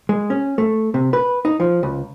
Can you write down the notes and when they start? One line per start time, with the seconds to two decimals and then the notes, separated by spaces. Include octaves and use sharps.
0.09 G#3
0.30 C#4
0.58 A3
0.94 C3
1.13 B4
1.45 D#4
1.60 F3
1.83 C#2